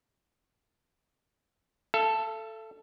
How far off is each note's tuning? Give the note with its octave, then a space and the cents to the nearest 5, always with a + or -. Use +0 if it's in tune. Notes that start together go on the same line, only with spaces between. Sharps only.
A4 +0 E5 +45